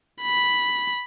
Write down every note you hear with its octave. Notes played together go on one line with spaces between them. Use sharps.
B5